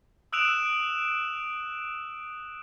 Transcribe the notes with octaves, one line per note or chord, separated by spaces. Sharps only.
D#6 E6 F#6 D7 E7 F7